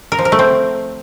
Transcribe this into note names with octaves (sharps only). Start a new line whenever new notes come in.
A#4
F3
A#4
A3
C4